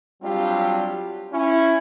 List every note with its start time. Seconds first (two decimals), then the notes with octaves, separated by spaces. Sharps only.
0.23 F#3 G3 C4 D4 F4 G4
1.33 C#4 E4